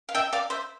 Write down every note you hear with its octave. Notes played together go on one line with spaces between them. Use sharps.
F5
E5 G5
D5 F5
C5 E5